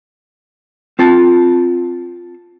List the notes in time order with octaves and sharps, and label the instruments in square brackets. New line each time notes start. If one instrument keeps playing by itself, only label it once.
[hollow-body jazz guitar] C4 F4 A5